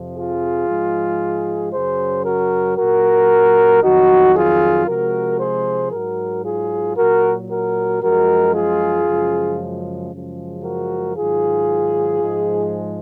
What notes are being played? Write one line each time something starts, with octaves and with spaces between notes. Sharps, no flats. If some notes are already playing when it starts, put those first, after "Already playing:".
Already playing: F2 C3 F3
F4 G#4
G#2 F3 G#3
F#2 C#3 F#3 G#4 C5
F#4 A#4
A#2 F#3 F#4 A#4
F2 D#3 F#3 D#4 F#4
F4 G#4
C3 F3 G#3 F#4 A#4
G#4 C5
G#2 F#3 F#4 A#4
F4 G#4
A#2 F#3 F#4 A#4
F#4 A#4
F#2 F3 G#3 F#4 A#4
F4 G#4
F#2 C#3 F3 G#3
F#2 C#3 F3 G#3
F#4 A#4
G#2 D#3 F#3 F4 G#4
G#2 F3 G#3